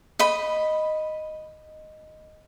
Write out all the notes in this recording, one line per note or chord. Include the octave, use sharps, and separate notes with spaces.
D#5 B5